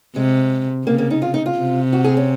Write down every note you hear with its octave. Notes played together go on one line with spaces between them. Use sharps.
C3 G#3
C#3 A#3
A#3
D#4
F4
D#4
F4
C3
F#4
G#4
C#4